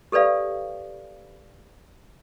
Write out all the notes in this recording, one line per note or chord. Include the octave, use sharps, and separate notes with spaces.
G4 A4 B4 D5 F5